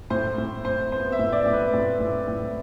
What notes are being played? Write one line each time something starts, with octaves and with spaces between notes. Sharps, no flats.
A2 C5
A2
A2 C5
B3 C5
E5
A2
D5
A2
B4
A2
A2
A2